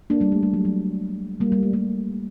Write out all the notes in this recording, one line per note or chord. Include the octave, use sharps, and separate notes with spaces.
A#3 D4
G3 A#3
A3
G3
F#3
F#3
G3 A#3
G3
A3
G3 A#3